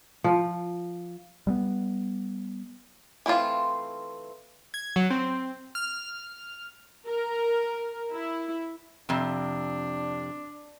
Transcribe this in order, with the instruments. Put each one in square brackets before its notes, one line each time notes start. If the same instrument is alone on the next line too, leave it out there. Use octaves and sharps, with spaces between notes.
[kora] F3
[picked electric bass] G3 G#3 B3
[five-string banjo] E3 A3 C4 F4
[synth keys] G#6
F#3
C4
F6
[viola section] A#4
E4
[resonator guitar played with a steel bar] F2 C3 [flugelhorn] D4